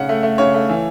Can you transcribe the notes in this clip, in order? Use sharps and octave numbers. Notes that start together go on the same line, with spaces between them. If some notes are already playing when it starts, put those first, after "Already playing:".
Already playing: C#3 F#5
A3
A3
C#3 C#5
A3
E3